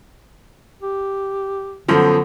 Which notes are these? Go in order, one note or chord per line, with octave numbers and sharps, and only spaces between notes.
G4
F#2 D3 F3 B3